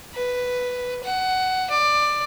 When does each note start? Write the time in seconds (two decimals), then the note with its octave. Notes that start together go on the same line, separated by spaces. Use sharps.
0.15 B4
1.04 F#5
1.70 D5